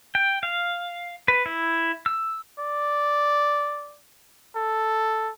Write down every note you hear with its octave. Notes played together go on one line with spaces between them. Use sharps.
G5
F5
B4
E4
E6
D5
A4